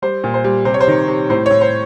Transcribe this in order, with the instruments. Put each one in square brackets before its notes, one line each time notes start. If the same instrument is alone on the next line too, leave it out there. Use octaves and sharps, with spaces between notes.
[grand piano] G3 C5
A#2
C5
G3
C3 C5
C#5
C5
D#3
C3
A2 C5
A2 C#5
C5